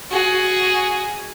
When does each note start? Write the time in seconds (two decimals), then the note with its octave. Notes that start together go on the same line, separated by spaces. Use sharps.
0.11 F#4 G#4